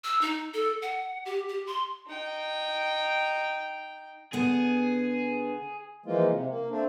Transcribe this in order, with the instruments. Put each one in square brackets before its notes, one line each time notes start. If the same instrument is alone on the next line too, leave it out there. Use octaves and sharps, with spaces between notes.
[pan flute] E6
D#4
A4
F#5
G4
G4
C6
[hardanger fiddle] D#4 G5
[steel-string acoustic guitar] D3 B3 [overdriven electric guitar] G#4
[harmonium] E3 F3 G#3 A#3 F4
C3
A#3
A3 C4 D4